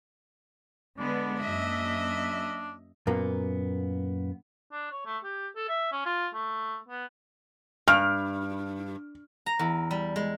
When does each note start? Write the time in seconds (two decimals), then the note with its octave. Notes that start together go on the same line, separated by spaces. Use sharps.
0.99 D3 G#3 B3 D4
1.40 F#2 A#3 D#5 E5
3.07 F#2 A#2 A#3 B3
4.72 D4
4.91 C#5
5.05 A3
5.24 G4
5.56 A4
5.68 E5
5.92 C#4
6.06 F4
6.34 A3
6.88 B3
7.88 G2 F6
9.46 A#5
9.59 E2
9.91 G3
10.16 G#3